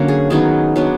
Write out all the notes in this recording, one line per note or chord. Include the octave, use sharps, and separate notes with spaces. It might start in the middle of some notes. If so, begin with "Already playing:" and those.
Already playing: D3 F#3 A#3 C#4
G#4
D#3 F#3 B3 D#4 G#4
F#3 B3 D4